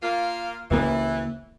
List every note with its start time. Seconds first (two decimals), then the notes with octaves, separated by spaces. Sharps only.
0.03 A#3 F4
0.71 C#2 E3 A#3